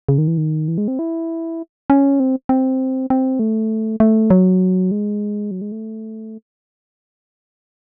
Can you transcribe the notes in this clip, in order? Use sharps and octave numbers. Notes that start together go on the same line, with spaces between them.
C#3
D#3
E3
D#3
E3
G#3
C4
E4
C#4
C4
C4
C4
A3
A3
F#3
G#3
F#3
G#3
A3